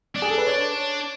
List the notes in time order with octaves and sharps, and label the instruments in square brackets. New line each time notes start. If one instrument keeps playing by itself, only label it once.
[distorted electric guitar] D4
[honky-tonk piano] G#4
A4
B4
C#5